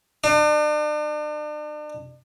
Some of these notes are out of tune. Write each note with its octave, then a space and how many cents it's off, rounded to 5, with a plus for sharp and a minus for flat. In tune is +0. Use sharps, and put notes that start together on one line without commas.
D4 +40